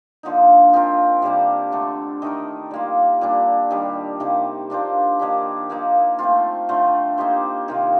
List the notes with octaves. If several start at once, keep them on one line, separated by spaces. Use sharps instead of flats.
D3 F3 A#3 D#4
F3 C4 F4 A#4
C3 G3 A#3 D4
D3 A3 D4 A4
D#3 A3 D#4 A#4
G3 A#3 F4
A#2 G3 D4
D#3 G3 D4
C3 D#3 A#3
A#3 D4 F4 C5
D#3 A#3 D4 G4
F3 A#3 D#4
A3 C4 F4
D3 A3 C4 F4
A#3 D#4 G4 C5
C3 D#3 A#3 F4